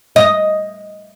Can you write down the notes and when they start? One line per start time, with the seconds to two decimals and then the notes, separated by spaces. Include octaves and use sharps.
0.16 D#5